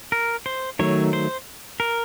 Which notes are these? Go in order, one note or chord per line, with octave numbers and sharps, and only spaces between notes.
A#4
C5
D#3 F#3 A3 C#5
C5
A#4